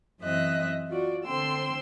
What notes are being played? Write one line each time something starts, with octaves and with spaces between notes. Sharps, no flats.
F#2 E3 C4 D#5 E5 F#6
F4 F#4 D5
D3 C4 G5 C6 E6